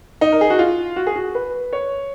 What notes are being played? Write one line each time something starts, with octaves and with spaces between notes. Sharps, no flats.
D#4
A#4
G#4
F#4
F4
F#4
G#4
F#4
B4
C#5